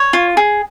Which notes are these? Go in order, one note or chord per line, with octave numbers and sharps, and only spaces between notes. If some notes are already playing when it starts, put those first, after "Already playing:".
Already playing: C#5
F4
G#4